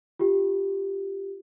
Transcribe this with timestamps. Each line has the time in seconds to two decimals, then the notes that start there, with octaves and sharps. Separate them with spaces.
0.19 F4 G4